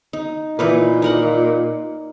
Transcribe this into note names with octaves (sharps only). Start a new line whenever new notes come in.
D#4
A#2 E3 D#4 B4
D#4 A#4 F#5